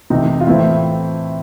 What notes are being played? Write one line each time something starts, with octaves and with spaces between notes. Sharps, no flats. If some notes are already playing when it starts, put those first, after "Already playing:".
C3 E3 A3 D#4
F4
A2 E3 A3 C4 E4